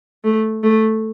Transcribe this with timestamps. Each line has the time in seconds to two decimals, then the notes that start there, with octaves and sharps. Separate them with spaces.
0.24 A3
0.63 A3